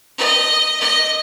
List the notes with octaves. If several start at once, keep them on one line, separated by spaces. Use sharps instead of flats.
D#5
D#5